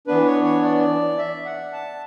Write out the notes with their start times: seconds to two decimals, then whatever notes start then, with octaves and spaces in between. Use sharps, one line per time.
0.07 E3 B3 D4 B4
0.26 C#5
0.44 C#5
0.63 D5
1.18 E5
1.45 F#5
1.73 A5